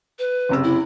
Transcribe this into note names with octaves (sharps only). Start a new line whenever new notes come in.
B4
F#1 C3 E6
E4